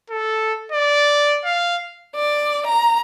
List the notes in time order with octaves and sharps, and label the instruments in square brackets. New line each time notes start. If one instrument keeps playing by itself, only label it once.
[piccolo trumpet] A4
D5
F5
[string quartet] D5
A#5